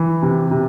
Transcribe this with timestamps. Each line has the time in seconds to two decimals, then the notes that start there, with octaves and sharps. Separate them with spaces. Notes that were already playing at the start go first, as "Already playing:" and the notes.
Already playing: E3
0.22 C3
0.51 C3